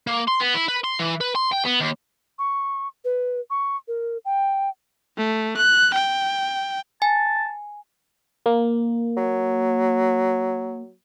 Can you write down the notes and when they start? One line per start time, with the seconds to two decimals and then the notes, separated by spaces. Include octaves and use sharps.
0.07 A#3
0.28 C6
0.40 B3
0.54 E4
0.68 B4
0.84 C6
1.00 E3
1.21 B4
1.35 C6
1.52 G5
1.65 B3
1.80 D#2
2.39 C#6
3.05 B4
3.50 C#6
3.88 A#4
4.25 G5
5.17 A3
5.57 F#6
5.94 G5
7.02 G#5 A5
8.46 A#3
9.17 F#3